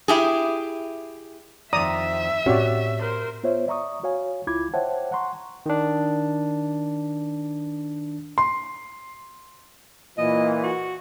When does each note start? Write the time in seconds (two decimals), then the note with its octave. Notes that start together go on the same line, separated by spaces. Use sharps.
0.08 E4 G4 G#4
1.73 F2 D#3 F3 D5 E5 A#5 D#6
2.46 A2 C4 C#4 F#4 G4 C#5 D5
3.00 A#4 C5
3.43 B3 F4 C5 C#5 E5
3.67 D5 E5 A#5 C#6 D#6
4.03 F#4 C#5 F5 G#5
4.47 C#2 E4 F4 B5 D6 G#6
4.74 C5 C#5 E5 F#5 G5 A5
5.12 F#5 A#5 C6 C#6
5.66 D#3 D4
8.38 C6
10.18 A#2 E3 D#5
10.63 F#4